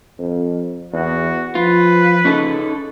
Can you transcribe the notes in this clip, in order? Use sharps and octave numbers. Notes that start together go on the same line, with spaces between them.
F2
E2 F#4
F3 F4 B4
C#3 C#4 D#4 A4